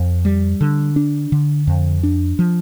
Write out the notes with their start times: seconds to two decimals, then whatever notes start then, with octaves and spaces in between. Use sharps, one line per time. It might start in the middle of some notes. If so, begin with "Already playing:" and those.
Already playing: F2
0.25 G3
0.61 D3
0.96 D4
1.32 D3
1.67 F2
2.03 D4
2.39 F3